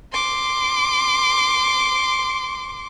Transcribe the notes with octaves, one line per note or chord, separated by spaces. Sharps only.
C6 D6